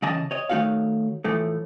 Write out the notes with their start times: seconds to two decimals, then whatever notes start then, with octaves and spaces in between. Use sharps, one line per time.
0.02 C#3 E3 D#5 A5
0.31 C#5 D#5
0.49 D#3 A3 D#4 F#4 C#5 F5
1.24 A2 E3 F3 A3